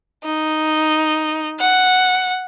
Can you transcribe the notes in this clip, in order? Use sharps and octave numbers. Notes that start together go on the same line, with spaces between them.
D#4
F#5